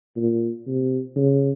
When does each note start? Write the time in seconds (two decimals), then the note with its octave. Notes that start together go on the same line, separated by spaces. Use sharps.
0.16 A#2
0.67 C3
1.16 C#3